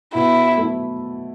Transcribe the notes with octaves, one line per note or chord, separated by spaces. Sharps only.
B2 E4
A3 E4